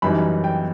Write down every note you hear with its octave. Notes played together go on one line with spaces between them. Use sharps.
F#2 E3 G3 D#4 B5
G5